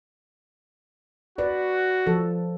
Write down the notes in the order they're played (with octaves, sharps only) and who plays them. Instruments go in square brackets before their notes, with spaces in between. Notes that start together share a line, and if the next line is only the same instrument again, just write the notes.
[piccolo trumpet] F#4 [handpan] B4 D5
[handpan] F3 A4